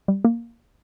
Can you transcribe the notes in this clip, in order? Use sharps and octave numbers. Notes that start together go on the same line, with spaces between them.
G3
A#3